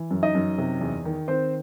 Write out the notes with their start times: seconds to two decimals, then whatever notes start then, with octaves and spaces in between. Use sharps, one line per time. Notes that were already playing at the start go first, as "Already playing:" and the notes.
Already playing: E3
0.11 F#2
0.23 D#4 D#5
0.35 F#2
0.58 C3
0.81 E2
1.05 D#3
1.28 D#3 C4 C5